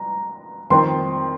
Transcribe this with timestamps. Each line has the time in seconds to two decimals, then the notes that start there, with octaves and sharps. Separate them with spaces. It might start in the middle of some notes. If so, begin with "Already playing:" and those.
Already playing: A#5
0.70 F2 D#3 C4 C6